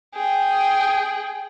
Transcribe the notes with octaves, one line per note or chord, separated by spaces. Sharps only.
G#4 G5